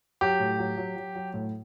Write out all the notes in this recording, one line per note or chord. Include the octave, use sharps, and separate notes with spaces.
F#3 G4
A2
F#3
F#3
F#3
F#3
A2